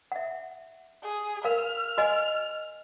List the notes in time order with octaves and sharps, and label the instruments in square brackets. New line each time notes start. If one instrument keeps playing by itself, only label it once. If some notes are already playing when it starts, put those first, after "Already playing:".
[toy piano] E5 F#5
[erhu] G#4
[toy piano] A#4 F5 [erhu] F6
[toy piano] F#4 D#5 G#5